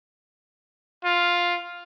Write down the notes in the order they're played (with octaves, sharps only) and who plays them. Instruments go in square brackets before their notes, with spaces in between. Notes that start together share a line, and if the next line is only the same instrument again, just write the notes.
[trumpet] F4